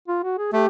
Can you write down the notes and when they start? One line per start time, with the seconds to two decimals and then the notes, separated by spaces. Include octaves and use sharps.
0.09 F4
0.23 F#4
0.38 G#4
0.52 A3 G4